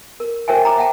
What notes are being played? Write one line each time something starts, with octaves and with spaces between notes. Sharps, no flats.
A#4
A#4 C5 C#5 E5 G5 G#5
D#5 A#5 D6
E5 F#5 G5 A5